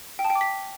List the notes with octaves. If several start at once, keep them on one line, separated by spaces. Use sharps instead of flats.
G5
A5
G5
D6
B6